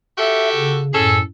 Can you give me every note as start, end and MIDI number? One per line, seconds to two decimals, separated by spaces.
0.18 0.81 66
0.18 0.81 67
0.18 0.81 69
0.18 0.49 76
0.55 0.91 49
0.94 1.21 42
0.94 1.21 45
0.94 1.18 61
0.94 1.18 68
0.94 1.18 69